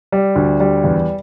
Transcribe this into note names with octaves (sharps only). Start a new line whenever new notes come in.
G3
D2
G3
E2